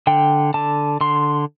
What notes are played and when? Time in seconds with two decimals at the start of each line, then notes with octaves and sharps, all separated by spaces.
0.07 D3 G5
0.54 D3 A5
1.01 D3 C6